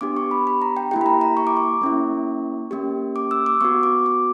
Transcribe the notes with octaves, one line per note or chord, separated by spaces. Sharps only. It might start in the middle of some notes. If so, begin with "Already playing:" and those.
B3 D4 G4 D6
C#6
B5
B5
A#5
G5
A#3 E4 G4 G5
B5
A#5
A#5
C#6
D6
C#6
A#3 C#4 E4
A#3 C#4 G4
D6
E6
D6
B3 F#4 C#6
D6
D6